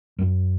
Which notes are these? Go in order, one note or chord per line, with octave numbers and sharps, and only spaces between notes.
F#2